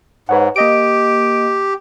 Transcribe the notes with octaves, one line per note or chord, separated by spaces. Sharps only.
G#2 B4 C#5 F#5
A#3 G4 D#5 D7